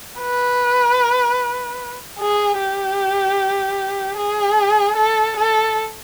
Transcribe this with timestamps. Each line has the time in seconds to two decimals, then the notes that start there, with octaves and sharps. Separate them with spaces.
0.21 B4
2.19 G#4
2.59 G4
4.17 G#4
4.97 A4
5.37 A4